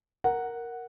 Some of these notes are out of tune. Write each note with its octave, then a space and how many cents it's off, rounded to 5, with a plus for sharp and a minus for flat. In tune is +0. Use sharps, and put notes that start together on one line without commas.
A#4 +0 F#5 +0